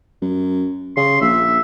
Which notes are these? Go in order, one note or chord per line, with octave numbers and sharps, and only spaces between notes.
F#2
C#3 C6
A#1 E5